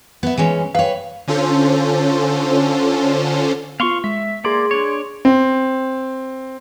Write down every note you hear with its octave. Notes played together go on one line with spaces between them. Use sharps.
B3 E5
E3 G#3 C#4
B4 C#5 F5 G5
D3 C#4 F4 A4 C5
B3 F4 F5 C6 C#6
G#3 E5
A#3 G#4 D5 C6 G#6
D4 C#5
C4